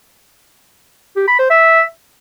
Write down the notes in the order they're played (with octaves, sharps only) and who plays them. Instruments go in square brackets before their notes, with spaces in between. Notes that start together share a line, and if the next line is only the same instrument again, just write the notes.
[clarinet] G4
B5
C5
E5